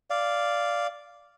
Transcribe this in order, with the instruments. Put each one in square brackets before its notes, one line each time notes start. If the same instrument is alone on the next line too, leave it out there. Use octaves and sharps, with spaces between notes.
[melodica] D5 F5